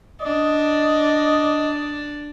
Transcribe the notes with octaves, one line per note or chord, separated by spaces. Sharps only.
D4 D5 D#5